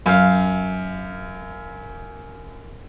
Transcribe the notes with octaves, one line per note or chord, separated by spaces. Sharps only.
F#2 F5